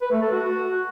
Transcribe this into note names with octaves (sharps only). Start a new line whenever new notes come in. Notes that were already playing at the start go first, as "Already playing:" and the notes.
B4
A3
A4
F#4